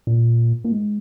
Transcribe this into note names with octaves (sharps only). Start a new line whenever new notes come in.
A#2
A#2
G#2